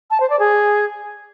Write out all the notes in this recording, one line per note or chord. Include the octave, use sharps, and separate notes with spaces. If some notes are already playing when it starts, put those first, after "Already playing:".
A5
C5
D5
G#4